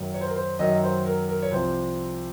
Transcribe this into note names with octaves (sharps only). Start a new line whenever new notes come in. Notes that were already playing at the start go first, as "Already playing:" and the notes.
Already playing: F#2 D#3 F#3
C#5
C5
A#4
C5
F#2 D#3 F#3 D#5
C5
A#4
A#4
C#5
C2 C3 F3 C5